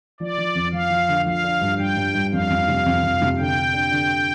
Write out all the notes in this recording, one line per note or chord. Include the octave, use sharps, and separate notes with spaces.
F3 D5
F3
F2
F3 F5
F3
D3
F3 F5
D4
G2
G2 G5
G2
G2
F2 F5
F2
C3
F2
F2
C3
D3 G5
D3
D4
D3
D4